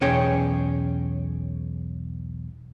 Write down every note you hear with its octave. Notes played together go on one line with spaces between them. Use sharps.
B1 E2 C#4 G#4 C#5 G5